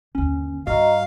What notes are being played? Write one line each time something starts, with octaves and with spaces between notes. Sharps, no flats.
G1 D#2 C#4
G2 F#4 D#5 F5 A#5